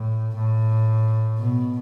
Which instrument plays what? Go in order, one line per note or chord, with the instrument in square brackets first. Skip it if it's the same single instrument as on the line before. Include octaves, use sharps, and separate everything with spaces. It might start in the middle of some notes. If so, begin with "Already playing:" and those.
Already playing: [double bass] A2
A2
B2